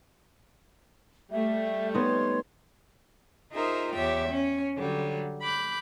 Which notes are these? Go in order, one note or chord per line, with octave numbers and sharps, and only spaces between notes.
G3 A3 E5
B3 D#4 C#5 C6
D#4 F4 G#4 A#4 C5 E5
E2 G4 C#5 E5 G5
C#4 C#5
D3 F#3 G3
B5 D6 F#6 G6